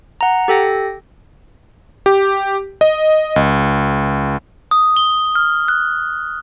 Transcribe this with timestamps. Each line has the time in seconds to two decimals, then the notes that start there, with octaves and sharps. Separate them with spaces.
0.21 F#5 A#5
0.48 G4 A4 G5 A#6
2.06 G4
2.81 D#5
3.36 C#2
4.71 D#6
4.97 G7
5.35 F6
5.68 F#6